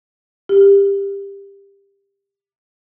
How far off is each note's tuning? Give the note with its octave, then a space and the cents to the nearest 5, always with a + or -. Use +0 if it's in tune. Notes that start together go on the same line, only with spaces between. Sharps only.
G4 +20